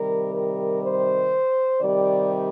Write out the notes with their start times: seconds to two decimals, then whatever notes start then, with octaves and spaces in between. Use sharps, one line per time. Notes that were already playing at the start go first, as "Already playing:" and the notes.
Already playing: C3 D#3 G3 A#4
0.32 A#4
0.82 C5
1.79 C3 D#3 G3 D5